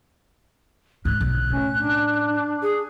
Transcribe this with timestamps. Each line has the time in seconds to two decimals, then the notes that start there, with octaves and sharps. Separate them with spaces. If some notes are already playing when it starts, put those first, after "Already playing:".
1.05 G#2 D3 F#6
1.20 B1 D3
1.50 A2 C#4
1.75 D4
2.62 G#4